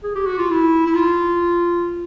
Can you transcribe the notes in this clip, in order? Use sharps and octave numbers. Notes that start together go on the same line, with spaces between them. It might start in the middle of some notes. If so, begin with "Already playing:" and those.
G#4
G4
F#4
F4
E4
E4
F4